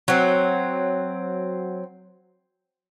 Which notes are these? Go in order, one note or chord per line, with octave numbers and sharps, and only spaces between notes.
F#3 C4